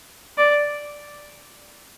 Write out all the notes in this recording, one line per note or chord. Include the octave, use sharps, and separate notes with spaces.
D5